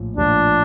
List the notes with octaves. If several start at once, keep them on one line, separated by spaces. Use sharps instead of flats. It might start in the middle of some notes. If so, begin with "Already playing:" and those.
Already playing: A#1 A2 F3
A#1 A2 F3 D4